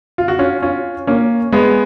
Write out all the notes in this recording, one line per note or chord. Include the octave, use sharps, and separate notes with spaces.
F4
F#4
C#4 F4
C#4 F4
A#3 C#4
G#3 B3